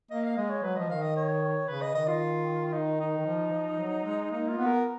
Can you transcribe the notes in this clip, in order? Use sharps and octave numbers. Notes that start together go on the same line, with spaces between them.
A#3 D#5
F5
G#3 D#5
C#5
F#3 B4
F3 D#5
D#3 F5
D#5
C#5
C#3 B4
D#5
D#3 D#5
F4
D#4
D#4
D#3
F3
F3
F#3
G#3
A#3 D#4
F4
B3
A#4